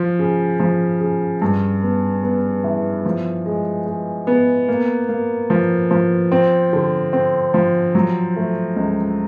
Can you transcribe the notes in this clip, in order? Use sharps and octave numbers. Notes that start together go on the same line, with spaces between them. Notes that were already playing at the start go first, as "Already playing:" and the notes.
Already playing: F3
C#3
F3
C#3
G2
B3
B3
E3
F3
G#3
G#3
B3
A#3
A#3
F3
F3
C4
D3
C4
F3
F#3
A3
C#2